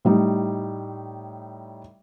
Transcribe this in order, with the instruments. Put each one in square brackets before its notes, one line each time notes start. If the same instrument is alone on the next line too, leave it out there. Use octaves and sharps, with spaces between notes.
[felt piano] A2 G3 D#4